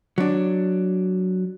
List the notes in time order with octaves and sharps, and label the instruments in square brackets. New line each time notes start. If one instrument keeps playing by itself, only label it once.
[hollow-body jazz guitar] F#3 D4